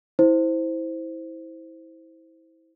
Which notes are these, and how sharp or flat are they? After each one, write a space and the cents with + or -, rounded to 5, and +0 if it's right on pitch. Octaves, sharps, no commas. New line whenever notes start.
E4 -20 C5 -5